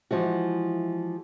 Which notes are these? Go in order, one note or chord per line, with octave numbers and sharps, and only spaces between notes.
E3 F3 G#3 F#4